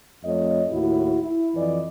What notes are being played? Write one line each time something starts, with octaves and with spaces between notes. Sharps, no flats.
F2 A3 C#5 D#5
D#2 A2 E4 F#4
E4
F2 E3 D5 D#5